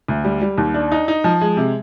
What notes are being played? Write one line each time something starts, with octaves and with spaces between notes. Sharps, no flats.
D2
G3
G3
D#2
D4
D#4
D#4
F3
G#3
C3